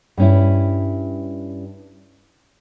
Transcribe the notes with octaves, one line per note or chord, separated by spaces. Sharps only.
G2 C#4 E4